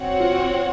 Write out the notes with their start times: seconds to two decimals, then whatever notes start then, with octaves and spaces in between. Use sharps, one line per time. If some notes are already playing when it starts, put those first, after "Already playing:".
Already playing: C4 F#4 C#5 F#5
0.20 F4